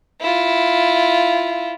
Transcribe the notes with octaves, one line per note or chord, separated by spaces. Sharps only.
E4 F4